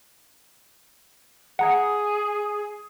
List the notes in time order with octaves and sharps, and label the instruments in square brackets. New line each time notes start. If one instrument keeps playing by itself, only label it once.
[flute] G#4 [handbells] F#5 A#5 G#6